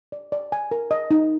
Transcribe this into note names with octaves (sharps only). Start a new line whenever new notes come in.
D5
D5
G#5
A#4
D#5
D#4